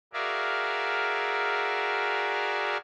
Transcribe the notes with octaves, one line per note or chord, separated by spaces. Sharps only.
F#4 G#4 A#4 D5 E5 F5